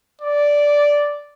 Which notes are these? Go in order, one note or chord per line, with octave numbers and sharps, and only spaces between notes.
D5